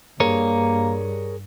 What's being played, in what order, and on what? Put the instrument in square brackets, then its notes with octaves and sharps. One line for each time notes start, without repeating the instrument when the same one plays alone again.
[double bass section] G2 [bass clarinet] A#3 [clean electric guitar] G#4 A#4 C#5